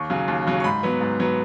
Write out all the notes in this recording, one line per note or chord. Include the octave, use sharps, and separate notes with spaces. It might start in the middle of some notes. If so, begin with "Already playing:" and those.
Already playing: D#2 C#6
C#3 F#3
D#2
C#3 F#3
C#6
G#2 B5
F#3 B3
G#2
F#3 B3